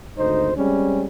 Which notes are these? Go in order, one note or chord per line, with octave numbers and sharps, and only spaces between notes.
G#1 D2 D#4 C5
G3 G#3 C4 C#4